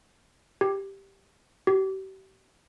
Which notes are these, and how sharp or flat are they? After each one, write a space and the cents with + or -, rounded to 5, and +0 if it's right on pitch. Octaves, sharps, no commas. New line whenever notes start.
G4 +0
G4 -40